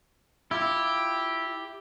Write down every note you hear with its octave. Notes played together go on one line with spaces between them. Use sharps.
E4 F4 G4